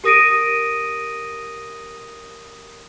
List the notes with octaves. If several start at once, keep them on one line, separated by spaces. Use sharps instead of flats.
G4 A#4 D#6 A#6 D7 D#7